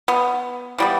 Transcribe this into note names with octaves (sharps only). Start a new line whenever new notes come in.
B3
E3 G3 B3